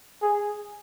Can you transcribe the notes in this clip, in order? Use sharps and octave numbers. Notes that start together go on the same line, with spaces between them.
G#4